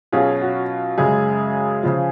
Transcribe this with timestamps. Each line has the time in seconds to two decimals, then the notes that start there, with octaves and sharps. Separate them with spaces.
0.12 B2 F#3 C#4 F4 G#4
0.42 F#4
0.98 F#2 C#3 G#3 G#4
1.83 C#3 F3